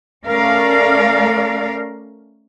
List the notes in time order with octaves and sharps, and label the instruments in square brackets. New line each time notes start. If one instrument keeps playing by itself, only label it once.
[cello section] A3 C#4 A#4 D5 F5